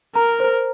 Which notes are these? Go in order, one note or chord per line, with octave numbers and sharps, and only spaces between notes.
A#4 A#5
C5